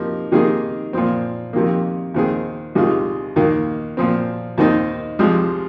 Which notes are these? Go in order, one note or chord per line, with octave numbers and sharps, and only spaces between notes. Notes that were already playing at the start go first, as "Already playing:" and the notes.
Already playing: C3 F3 A#3 D#4
C3 D#3 A#3 D#4 G#4
A#2 F3 C4
F2 C3 D#3 A#3
D#2 D#3 C4 G#4
C2 C3 D#3 G#3 F4
D#2 D#3 A#3
A#2 F3 C4
D#2 D#3 C4 D#4
C2 C3 F3 G#3